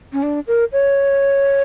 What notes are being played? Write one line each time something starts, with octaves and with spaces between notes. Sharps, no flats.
C#4
D4
A#4
C#5